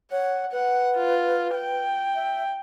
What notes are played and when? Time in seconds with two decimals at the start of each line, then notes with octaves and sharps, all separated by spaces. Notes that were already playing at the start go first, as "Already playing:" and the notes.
0.11 C#5 F#5
0.52 B4 F#5
0.97 F4
1.55 G5
2.15 E5